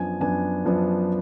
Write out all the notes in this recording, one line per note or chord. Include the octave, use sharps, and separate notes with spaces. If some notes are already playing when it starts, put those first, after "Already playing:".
Already playing: F#2 F3 B3 D4 G#5
F#2 F3 B3 D4 G#5
F#2 F3 B3 D4